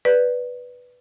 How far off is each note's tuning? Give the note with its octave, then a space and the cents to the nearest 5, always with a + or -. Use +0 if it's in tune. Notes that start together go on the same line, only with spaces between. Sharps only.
B4 +0 D5 +0